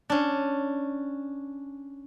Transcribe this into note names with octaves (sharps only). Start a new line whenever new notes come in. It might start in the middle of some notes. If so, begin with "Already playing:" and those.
C#4 D4